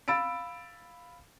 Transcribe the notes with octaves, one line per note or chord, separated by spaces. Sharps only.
F5 B5 E6 A6 D7